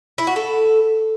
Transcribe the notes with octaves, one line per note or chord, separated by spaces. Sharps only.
E4
F#4
A4